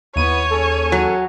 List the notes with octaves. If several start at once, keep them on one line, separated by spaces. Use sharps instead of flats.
D#2 B3 E4 C#5 D#7
C#4 G#4 A4
F#3